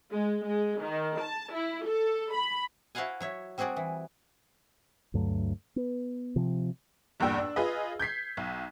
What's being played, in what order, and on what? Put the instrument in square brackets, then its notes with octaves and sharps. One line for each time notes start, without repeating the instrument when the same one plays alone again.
[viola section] G#3
G#3
D#3
A5
E4
A4
B5
[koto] E4 F#4 C5 F5 F#5 G#5
F#3 C#5 E5
G3 C4 F#4 G#4 D5
E3
[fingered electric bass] D2 G2 F#3 A3
B3
C3 F3
[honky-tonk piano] E2 G2 A#2 G5 E6
D4
F4 G#4 B4 D#5
G6 G#6 B6 C7
B1